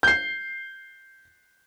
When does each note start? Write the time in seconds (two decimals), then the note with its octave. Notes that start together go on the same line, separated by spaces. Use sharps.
0.03 G6 C7